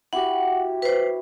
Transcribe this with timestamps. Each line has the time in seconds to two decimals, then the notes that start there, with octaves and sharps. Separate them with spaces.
0.13 E4 F#4 G4 F#5
0.82 B4 C5